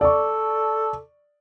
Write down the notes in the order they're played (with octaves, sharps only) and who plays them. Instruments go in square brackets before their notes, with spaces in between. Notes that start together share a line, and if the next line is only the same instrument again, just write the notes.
[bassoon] A4 [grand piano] D5 C#6